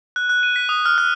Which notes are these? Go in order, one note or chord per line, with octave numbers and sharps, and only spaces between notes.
F#6
F#6
D#7
B6
D#6
F6
F#6